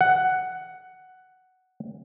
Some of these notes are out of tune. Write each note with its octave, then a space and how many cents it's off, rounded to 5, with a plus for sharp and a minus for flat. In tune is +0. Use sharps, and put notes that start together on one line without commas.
F#5 +5